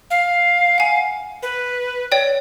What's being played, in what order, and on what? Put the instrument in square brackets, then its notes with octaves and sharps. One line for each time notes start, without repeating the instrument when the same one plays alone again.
[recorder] F5
[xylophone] F#5 G#5
[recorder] B4
[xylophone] C#5 D5 G5